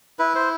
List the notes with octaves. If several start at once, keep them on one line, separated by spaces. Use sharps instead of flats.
E4 B4
C5